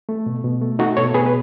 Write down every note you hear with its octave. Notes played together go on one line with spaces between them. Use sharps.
A3
B2
B2
A3
A3 D#4 F#4
B2 A4 C#5
B2 G#4 B4
B4